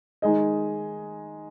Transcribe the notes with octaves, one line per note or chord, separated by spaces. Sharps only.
D#3 G#3 D#4 G#4 D#5